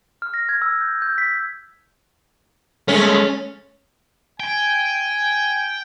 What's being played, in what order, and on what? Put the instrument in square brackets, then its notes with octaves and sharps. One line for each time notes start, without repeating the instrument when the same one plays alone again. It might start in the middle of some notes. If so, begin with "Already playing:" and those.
[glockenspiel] F6
A#6
G#6
E6
G6
G6
B6
[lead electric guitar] G#3 A3 [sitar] C#4
[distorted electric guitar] G5 [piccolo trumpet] G#5